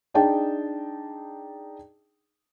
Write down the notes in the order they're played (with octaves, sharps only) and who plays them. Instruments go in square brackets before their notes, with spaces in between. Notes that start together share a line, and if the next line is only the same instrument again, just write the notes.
[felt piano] D4 D#4 G#4 G5 A5